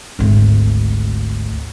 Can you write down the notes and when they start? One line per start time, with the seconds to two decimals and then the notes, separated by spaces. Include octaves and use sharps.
0.19 G#1 D2